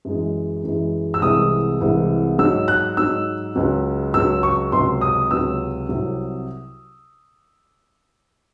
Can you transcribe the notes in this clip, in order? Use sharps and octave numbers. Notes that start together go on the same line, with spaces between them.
F#2 E3 G#3
F#2 E3 G#3
E6
C2 C3 E3 G#3 D#6
C2 C3 E3 G#3
G#2 F#3 E6
F#6
G#2 F#3 E6
C#2 C#3 F#3
C#2 C#3 F#3 E6
C#6
C#2 C3 F#3 C6
D#6
C#2 C3 F#3 E6
C2 C3 F#3